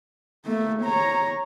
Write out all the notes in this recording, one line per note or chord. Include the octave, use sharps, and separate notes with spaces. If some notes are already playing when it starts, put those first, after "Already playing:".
A3 A#3
C#5 A#5